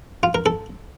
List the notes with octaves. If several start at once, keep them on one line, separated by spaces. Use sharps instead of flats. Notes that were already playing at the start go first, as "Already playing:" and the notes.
F4
A#4
A4